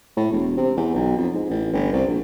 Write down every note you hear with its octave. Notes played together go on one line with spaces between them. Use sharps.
A2
E1
C3
E2
B1
F2
G#2
A1
G1
C2
A#1